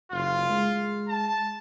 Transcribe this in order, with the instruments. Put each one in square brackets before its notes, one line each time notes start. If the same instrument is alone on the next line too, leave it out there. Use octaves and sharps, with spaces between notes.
[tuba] F#1 [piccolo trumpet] F4
[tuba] G#3
[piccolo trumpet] A5